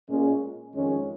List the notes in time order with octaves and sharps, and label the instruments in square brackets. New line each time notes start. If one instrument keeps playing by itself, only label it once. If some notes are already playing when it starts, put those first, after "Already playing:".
[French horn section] A#2 G#3 C#4
F2 D#3 G#3 C#4